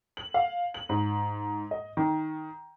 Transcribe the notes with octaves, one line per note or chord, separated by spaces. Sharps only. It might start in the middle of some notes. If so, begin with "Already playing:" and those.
F#7
F5
F#7
G#2
D#5
D#3